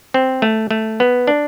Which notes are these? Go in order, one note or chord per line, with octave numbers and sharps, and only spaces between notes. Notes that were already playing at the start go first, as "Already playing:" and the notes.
C4
A3
A3
B3
D4